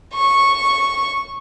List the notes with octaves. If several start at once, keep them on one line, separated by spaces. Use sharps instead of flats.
C#6